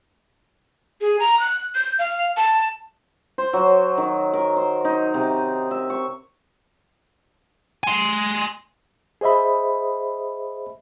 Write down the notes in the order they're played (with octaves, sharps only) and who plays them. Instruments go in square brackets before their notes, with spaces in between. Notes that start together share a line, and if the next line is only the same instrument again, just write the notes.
[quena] G#4
A#5
F#6
G6
F5
A5
[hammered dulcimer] C5
F#3
D#3
A#4
C5
D#4
C3
E5
C#6
[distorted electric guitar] G#5 C6
[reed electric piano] G#4 C5 D#5 E5 B5